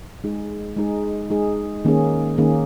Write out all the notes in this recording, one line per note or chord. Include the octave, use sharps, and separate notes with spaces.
G#3 D#4 G#4
G#3 D#4 G#4
G#3 D#4 G#4
D#3 A#3 C#4 G#4
D#3 A#3 C#4 G#4